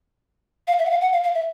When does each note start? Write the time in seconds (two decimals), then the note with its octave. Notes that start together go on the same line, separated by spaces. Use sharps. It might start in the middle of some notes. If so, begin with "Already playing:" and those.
0.68 F5
0.79 E5
0.86 F#5
0.90 F5
1.01 F#5
1.12 F5
1.24 F5
1.35 E5